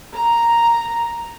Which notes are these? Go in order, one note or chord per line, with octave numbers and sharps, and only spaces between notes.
A#5